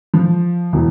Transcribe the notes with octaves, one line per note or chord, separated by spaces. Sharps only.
F3
E1